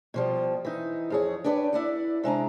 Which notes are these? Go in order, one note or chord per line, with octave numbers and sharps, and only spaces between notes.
B2 F3 G3
E3 D#4
F2 G#4 C#5
D4 G4 B4 C#5 D5
E4 D5 F#5
C3 G#3 D4 A#5